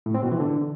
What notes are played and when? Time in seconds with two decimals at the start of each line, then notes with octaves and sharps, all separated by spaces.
0.06 A2
0.15 C4
0.23 B2
0.32 E3
0.40 D3